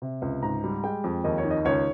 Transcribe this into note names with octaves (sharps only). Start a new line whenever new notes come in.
C3
C#2
G#2 A#5
G3
G#3 G5
F2
D#2 D#5
C#5
D#3
D#5
C#2 C#5